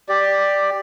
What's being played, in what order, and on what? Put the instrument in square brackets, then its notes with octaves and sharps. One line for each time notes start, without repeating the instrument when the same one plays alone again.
[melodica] G4 D5